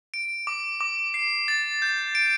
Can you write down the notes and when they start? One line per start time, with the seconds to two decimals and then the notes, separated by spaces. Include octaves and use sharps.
0.14 D7
0.47 D6
0.81 D6
1.14 C7
1.48 A6
1.82 G6
2.15 D7